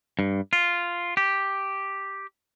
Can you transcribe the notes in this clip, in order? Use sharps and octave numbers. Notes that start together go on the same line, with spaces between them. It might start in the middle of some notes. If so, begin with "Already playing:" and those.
G2
F4
G4